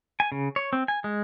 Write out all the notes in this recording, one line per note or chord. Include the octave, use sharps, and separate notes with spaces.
G#5
C#3
C#5
C4
G#5
G#3